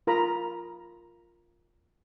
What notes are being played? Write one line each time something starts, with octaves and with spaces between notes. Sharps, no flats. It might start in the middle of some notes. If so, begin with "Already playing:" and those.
F4 A#4 A#5 B5